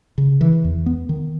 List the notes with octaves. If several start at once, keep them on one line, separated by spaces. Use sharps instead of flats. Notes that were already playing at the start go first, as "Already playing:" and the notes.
C#3
E3
E2
B3
D#3